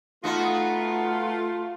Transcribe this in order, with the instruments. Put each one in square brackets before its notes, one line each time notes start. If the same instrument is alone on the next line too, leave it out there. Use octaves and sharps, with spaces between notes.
[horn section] A3 F4 [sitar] B3 D#4 F#4